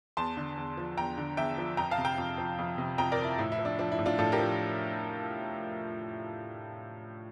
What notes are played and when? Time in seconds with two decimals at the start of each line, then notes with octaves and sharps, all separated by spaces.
0.17 E2 A5 C6
0.37 D3
0.57 E2
0.77 F3
0.97 E2 G5 A#5
1.18 D3
1.37 E2 E5 G5
1.58 F3
1.77 F2 G5 A#5
1.91 F5 A5
1.98 C3
2.05 G5 A#5
2.18 F2
2.38 F3
2.59 F2
2.78 C3
2.98 F2 G5 A#5
3.12 A#4 D5
3.18 F3
3.25 E4
3.38 A2 E4
3.52 E4
3.58 F3
3.65 D4
3.79 F3 D4
3.92 E4
3.99 A2
4.06 D4 F4
4.18 A2 F4 A4
4.32 G4 A#4
4.39 F3